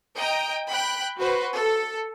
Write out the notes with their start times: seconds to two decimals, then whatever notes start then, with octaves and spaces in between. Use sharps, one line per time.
0.17 D#5 G5 A#5
0.68 G5 B5 F#6
1.19 F#4 B4 C5
1.55 A4